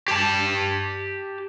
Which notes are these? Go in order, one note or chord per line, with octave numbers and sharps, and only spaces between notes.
G4 A5